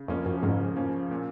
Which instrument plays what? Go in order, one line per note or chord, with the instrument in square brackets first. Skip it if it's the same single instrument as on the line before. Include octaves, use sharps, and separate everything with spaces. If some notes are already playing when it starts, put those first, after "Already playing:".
Already playing: [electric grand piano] C#3
[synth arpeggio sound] F2 [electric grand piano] F3 A#3 C#4
[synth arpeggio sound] F#2
[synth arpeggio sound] F2 G#2 [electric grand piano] C#3
[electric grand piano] F3 A#3 C#4
A#2